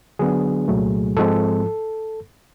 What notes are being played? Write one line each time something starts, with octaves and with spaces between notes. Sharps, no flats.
D3 F#3 B3 D4 G#4
C2 A#2 F#3 A3
G#2 F3 G#3 C4 A4